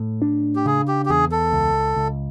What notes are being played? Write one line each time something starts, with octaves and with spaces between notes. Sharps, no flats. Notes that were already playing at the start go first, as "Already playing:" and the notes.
Already playing: A2
D4
G4
C#3 G#4
G4
G4
E2 G#4
A4
C#2
C#2